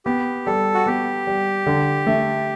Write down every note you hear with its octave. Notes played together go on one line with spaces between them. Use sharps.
B3 G4
G3 A4
F#4
B3 G4
G3
D3
A3